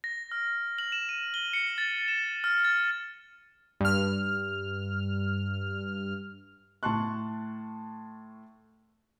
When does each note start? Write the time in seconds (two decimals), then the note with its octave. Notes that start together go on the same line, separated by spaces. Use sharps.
0.04 A#6
0.32 F6
0.78 F#7
0.92 E7
1.09 D#7
1.34 G7
1.53 C#7
1.78 A6
2.08 E7
2.44 F6
2.64 A6
3.81 G2 F6
6.83 A2 A5 C6 C#6 F#6